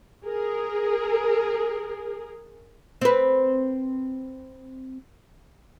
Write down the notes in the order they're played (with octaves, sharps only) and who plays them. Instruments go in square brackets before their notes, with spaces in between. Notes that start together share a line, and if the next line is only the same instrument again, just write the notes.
[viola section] G#4 A#4
[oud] C4 B4